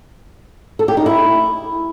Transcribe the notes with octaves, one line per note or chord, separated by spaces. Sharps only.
A4
G4
D#4
E4